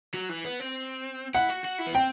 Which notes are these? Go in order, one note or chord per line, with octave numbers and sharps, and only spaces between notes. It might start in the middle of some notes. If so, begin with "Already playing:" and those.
F#3
E3
B3
C4
E4 F#5
F#4
F#4
E4
B3
C4 G5